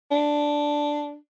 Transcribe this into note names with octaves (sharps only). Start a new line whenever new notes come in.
D4